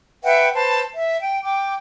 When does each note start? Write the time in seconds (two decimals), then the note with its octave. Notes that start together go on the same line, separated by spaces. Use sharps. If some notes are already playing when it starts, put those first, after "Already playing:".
0.23 B4 E5 F#5 G5
0.54 B4 C5 A5
0.93 E5
1.21 G5
1.43 G5 D6